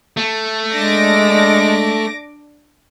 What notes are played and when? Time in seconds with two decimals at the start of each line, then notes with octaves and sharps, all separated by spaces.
0.17 A3
0.73 G#3 D4 D6 A#6